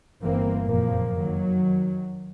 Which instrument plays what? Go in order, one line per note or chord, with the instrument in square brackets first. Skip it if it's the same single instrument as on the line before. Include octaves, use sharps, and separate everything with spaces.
[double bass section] G1 E3 A#3 C4
F#1 F2 A#2 F3 A#3
D#3 F#3